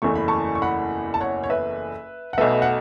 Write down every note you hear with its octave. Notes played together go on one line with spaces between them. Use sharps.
F#1 E2 E3 A3 C#6
B5
A5 C#6
C#6
F#5 B5
A5
C#5 F#5
C#5
B4 E5
F#5
B1 B2 A3 B4 E5
F#5